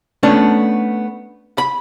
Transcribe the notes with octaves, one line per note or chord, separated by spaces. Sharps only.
A3 B3 C#4 D4
B5